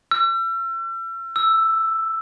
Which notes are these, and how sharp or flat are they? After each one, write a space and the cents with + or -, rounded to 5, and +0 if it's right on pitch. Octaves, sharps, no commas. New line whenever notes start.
E6 +40
E6 +5